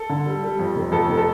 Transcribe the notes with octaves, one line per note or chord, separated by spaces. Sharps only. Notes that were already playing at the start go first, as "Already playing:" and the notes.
Already playing: A4
D3
G3
G3
F2
F1
F2 A4
F1
A4